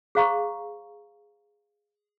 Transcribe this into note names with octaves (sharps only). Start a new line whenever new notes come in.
G#4 C5 F5 A#5 C#6